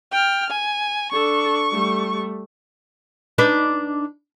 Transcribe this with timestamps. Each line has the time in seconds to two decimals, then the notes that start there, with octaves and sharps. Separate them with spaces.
0.11 G5 F6
0.50 G#5
1.12 D4 A4 C#6
1.71 G3 A3
3.38 D4 D#4 B4